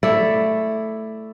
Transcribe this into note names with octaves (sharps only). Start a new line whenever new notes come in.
A3 E4 D5